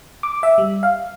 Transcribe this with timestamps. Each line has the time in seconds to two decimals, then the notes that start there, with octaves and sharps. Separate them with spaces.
0.23 D6
0.43 E5
0.58 G3
0.83 F5